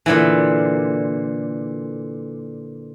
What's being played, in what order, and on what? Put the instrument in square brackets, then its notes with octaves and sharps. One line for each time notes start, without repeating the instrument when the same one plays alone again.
[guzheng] A#2 D3 E3